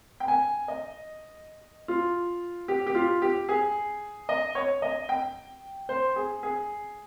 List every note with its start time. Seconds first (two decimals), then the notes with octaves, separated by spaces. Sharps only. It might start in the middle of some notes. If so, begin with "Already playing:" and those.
0.20 G5
0.28 G#5
0.68 D#5
1.88 F4
2.68 G4
2.87 G4
2.95 F4
3.22 G4
3.49 G#4
4.29 D#5
4.55 C#5
4.82 D#5
5.09 G5
5.89 C5
6.16 G#4
6.43 G#4